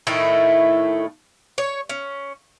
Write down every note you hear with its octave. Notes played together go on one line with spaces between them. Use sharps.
A2 D#3 A3 E4
C#5
C#4